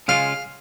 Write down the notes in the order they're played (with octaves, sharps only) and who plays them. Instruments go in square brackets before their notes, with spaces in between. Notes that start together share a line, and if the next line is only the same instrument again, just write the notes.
[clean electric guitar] C#3 G#3 C#4 F4 [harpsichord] F5